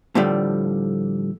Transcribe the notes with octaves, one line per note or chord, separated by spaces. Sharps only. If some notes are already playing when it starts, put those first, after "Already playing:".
A2 D3 F3 G3 A3